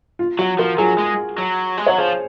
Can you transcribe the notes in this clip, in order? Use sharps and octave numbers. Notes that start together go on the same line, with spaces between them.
F4
F#3 F#4
F3 F#4 A#4
F#3 F4 G#4
G#3
F#3
G#3
F#3 C#5
F3 G#4 C5